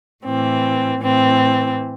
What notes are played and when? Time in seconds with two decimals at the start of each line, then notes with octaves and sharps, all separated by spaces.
0.23 A2 E3 C4
1.01 A2 E3 C4